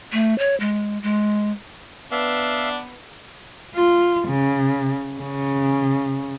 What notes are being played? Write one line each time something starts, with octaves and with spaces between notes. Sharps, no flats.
A3
C#5
G#3
G#3
B3 D4 E5 F5
F4
C#3
C#3